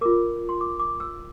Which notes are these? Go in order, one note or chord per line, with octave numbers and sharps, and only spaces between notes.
F4 A#4 D6
C6
D6
D6
E6